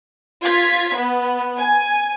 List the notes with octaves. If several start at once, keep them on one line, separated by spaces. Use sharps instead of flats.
F4 G#6 B6
B3
G#5